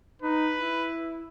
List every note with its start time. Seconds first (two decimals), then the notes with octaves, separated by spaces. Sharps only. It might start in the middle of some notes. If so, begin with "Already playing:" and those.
0.22 D#4 B4
0.58 E4